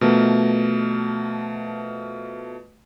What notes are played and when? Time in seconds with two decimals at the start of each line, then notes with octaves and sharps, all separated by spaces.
0.01 B2 F3 A3 A#4